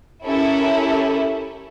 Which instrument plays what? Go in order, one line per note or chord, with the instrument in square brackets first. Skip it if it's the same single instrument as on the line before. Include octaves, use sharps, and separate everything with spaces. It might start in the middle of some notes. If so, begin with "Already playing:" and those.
[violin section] C#4 E4 G4 A4 A#4